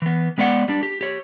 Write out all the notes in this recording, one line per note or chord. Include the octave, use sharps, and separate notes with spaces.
E3 B3
G#3 B3 D5 F5 F#5
G3 D4
G4
G4 C#5